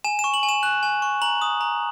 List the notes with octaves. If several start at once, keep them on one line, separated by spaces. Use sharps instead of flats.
G#5 E7
E7
C#6
F#7
G#5
E7
F#6
G#5
C#6
A#5 F#7
D#6
A#5